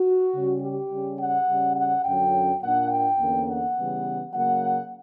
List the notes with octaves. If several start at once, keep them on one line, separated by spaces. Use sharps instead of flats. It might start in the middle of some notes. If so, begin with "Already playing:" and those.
Already playing: F#4
C#3 G3 C#4
G4
C#3 G3 C#4
F#5
C#3 G3 C#4
F#5
F#2 D3 F#3 C#4 G5
A#2 A#3 D4 F#5
G5
E2 D3 A#3 C#4
F#5
C#3 E3 G3 B3
C#3 F#3 A#3 F#5